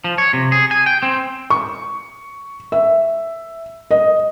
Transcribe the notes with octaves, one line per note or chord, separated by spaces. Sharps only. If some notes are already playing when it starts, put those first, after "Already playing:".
F3
C#5
C3
G#4
G#5
G5
C4
C#6
E5
D#5